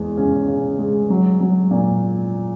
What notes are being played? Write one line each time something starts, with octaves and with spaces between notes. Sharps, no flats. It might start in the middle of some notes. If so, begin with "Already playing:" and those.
Already playing: E2 G#3
C#3 C#4
C#3
G#3
F#3
F#3
A#2